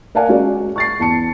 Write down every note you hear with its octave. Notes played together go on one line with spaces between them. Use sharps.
A#4 D5 F5 F#5 G#5
G#3 C#4 F#4 D5
C#6 A6 C7
E2 A5 C#7